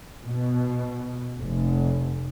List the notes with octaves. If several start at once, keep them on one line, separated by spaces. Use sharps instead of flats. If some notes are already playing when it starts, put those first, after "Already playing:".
B2
F1